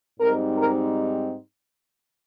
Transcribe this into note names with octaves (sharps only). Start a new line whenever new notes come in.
G#2 G3 C4 D#4 A#4
A#4